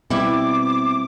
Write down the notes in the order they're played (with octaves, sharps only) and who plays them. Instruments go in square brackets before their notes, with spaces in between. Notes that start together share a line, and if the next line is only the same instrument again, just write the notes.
[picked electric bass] B2 G3 B3 [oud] C4 E4 [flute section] D6